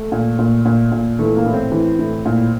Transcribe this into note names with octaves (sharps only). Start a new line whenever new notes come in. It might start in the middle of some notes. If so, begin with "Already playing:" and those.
Already playing: A3
A#2
A#2
A#2
A#2
E3 A3
A#3
A2
C4
E3
A2
A#2